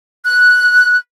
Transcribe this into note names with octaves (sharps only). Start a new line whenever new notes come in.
F#6